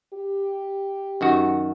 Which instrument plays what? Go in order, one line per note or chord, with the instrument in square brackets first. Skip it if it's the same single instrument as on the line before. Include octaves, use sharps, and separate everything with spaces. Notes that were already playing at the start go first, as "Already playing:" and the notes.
[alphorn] G4
[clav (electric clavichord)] F#2 D#3 F#4